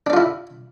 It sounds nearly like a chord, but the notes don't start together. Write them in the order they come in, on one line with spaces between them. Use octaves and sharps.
D4 D5 F4 E4